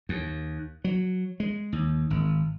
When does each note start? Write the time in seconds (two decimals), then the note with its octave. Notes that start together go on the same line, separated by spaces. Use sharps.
0.09 D#2
0.84 F#3
1.40 G#3
1.72 D#2
2.10 G#1